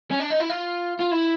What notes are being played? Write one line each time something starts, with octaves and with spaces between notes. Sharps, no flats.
C#4
D4
D#4
E4
F4
F4
E4